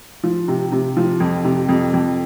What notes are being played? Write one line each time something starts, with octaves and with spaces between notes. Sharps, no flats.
F3
C3
C3
F3
F2
C3
F2
F2